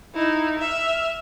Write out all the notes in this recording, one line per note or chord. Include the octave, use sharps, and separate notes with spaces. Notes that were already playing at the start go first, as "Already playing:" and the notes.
D#4 E4
E5 F6